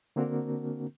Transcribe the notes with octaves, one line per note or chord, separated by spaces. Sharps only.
D3 A#3 C4 D4 F#4 A#4